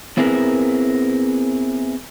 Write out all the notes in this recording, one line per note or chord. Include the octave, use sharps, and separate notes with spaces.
B3 C4 E4 G#4 A#4 B4